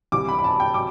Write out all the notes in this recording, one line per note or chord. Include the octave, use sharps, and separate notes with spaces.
C2 C3 E3 G3 D6
B5
B5
A5
G5
F#3 D6